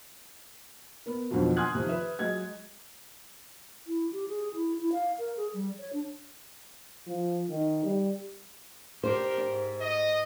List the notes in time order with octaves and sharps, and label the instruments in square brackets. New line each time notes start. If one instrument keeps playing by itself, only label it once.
[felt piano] B3 A#4
F2 B2 D3 D#3 F3 F#3
G#5 C6 D#6 F6 F#6 G#6
C3 D#3 F3
B4 E5
F#3 G#3 D#5 G#6
[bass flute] E4
G4
G#4
E4
E4
F5
A#4
G#4
G3
C#5
D4
[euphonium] F3
D#3
G3
[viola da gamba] D4 G4 A#4 [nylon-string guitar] C5
[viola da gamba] G#2
[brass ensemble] D#5